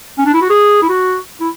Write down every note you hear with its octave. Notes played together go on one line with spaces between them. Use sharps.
C#4
D4
E4
F#4
G#4
E4
F#4
E4